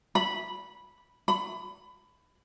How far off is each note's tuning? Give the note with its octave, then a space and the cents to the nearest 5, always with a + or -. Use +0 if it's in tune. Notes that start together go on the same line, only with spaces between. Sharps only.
B5 -10
B5 +20